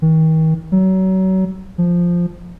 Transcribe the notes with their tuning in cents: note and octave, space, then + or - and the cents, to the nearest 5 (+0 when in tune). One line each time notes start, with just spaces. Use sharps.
D#3 +40
F#3 +30
F3 +0